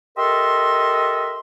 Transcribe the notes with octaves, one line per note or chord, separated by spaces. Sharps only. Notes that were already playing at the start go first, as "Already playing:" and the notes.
G4 A4 A#4 D#5 E5 C6